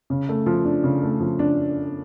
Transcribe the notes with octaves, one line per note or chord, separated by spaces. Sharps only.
C#3
A3
F3
D4
C#3
A3
F3
D4